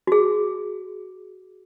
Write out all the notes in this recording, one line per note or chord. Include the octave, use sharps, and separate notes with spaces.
F#4 G#4